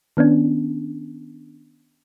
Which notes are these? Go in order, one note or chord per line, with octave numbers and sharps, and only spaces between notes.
D#3 B3 C#4 D4